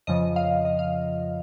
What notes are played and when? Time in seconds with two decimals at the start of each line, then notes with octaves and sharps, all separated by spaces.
0.07 F2 C#3 F3 D#5
0.36 F5
0.65 D#5
0.79 F5